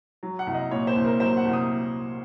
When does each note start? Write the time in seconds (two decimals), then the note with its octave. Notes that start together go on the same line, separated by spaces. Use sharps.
0.23 F#3
0.39 F#5
0.47 C2
0.54 D#5
0.71 A#2 C#5
0.87 C5
0.96 C2
1.05 A#4
1.20 F#3 C5
1.37 F#5
1.45 C2
1.53 D#6